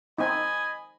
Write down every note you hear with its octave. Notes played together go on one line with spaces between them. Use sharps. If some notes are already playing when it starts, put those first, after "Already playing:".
C4 D#4 D#5 G#5 B5